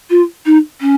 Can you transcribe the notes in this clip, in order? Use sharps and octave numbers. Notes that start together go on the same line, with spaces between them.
F4
D#4
C#4